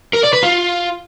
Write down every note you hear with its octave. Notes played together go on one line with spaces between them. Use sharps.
A#4
D5
B4
F4